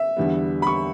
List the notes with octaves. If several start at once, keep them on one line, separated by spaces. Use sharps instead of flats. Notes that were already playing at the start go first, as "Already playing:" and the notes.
Already playing: E5
E2 D3 G3 B3
B5
C#6